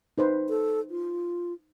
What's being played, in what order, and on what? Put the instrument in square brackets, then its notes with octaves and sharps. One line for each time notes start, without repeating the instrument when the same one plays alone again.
[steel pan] D#4 B4 C5
[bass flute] A4
F4